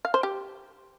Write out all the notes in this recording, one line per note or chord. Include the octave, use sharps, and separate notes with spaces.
F5
C5
G4